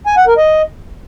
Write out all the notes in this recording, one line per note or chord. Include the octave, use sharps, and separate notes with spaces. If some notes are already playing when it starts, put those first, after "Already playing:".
G#5
F#5
A#4
D#5